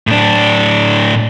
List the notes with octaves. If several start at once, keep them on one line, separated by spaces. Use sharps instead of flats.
A2 D4